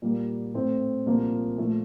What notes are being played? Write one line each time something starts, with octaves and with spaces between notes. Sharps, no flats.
A#2 G3 A#3
A2 A3 C4
C2 A#2 F3 A#3
A#2 F3 A3